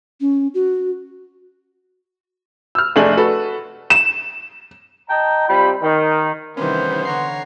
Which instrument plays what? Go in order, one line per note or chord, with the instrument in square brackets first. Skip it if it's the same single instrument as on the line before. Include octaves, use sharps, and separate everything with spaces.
[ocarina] C#4
F#4
[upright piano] E6 F6
F1 A3 D4 G#4 F#7
F#4 A4 B4
[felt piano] E7
[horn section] D#5 G5 A5 A#5
C3 G3 F4 G5 B5
D#3
[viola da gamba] C3 D#3 E3 [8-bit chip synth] G3 C#4 [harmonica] B3 C6 [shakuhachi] C5
[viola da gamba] D3 [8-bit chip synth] C#5 A#5 C7 [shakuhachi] F#5